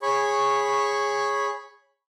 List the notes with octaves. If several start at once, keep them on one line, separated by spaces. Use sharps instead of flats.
G#4 C#5 B5 C#6